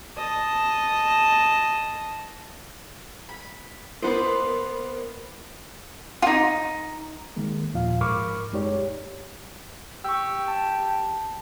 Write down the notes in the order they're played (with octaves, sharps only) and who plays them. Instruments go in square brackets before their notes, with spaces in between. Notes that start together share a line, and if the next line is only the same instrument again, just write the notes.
[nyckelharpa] D#5 A5
[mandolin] B5
[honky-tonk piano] A#3 B3 B5 [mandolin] C5 D5 D#5
[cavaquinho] D#4 F4
[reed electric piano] D#3 G#3 A#3
D#2 A#2 F3 F4 F5
G#2 A#4 B5 C#6 D6 F6
F#2 G#3 D#4 G4 C#5 D5
[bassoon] G4 [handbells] C#6 E6
[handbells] A5